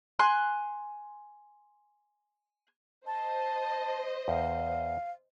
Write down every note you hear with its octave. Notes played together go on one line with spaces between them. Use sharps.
G#5 C6 F#6
C5 D#5 A5
E2 F5